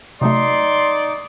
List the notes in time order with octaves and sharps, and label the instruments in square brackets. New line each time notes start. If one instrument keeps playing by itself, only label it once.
[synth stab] C3 F#3 A3 [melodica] D#4 [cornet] D5 [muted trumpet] C6